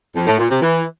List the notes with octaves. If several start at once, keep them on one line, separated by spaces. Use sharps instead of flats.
F2
A2
A#2
C3
E3